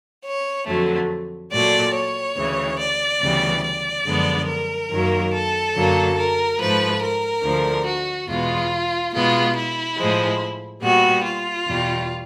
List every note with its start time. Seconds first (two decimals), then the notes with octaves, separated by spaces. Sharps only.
0.25 C#5
0.67 F2 D3 F#3 A3
1.52 A#2 F#3 A3 D5
1.94 C#5
2.37 D2 C#3 E3
2.79 D5
3.22 D2 C#3 E3 G3 B3
3.63 D5
4.06 F#2 D3 F3 G#3 B3
4.47 A#4
4.90 F#2 D#3 F#3 A#3
5.33 A4
5.75 F#2 D3 F#3 A#3
6.16 A#4
6.59 G#2 F3 A3 B4
7.02 A#4
7.43 D2 D3 F3 A3
7.86 F#4
8.28 E2 B2 G#3 B3 F4
9.12 B2 G#3 B3 F4
9.56 E4
9.98 A2 F3 G#3
10.82 A#2 G3 B3 F#4
11.24 F4
11.67 E2 B2 G3